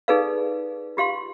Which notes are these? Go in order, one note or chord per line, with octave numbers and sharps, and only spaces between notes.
D#4 G#4 A4 B4 D5 F5
F4 G4 F5 C6